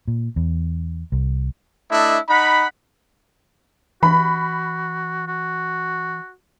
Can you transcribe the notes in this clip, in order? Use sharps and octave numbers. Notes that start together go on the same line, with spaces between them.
A#2
E2
C2
A3 D4 E4 D#5
D#4 F#5 B5
E3 F#4 B5
F#4